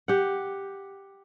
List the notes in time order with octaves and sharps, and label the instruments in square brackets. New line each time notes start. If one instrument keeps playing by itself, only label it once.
[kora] G4 F#5